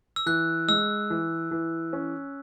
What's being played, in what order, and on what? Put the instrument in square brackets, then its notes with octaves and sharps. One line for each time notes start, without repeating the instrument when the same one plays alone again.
[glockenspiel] E6
[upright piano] E3 [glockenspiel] F#6
[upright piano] G#3 [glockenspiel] E6
[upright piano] E3
E3
C#4